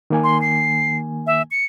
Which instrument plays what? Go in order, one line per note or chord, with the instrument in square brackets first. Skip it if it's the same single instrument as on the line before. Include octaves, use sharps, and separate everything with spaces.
[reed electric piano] D#3 A#3 G#5
[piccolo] C6
C7
E5
C#7